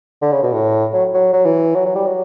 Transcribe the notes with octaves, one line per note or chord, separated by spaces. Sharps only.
D3
C#3
B2
A2
F#3
F#3
F#3
E3
F#3
F#3
G3
F#3